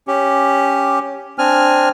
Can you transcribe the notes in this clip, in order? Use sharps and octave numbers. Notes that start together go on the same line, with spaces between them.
C#4 G4
C4 D4 G#5 F6